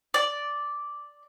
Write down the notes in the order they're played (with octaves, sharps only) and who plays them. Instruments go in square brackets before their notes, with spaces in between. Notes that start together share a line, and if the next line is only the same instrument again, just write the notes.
[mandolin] D5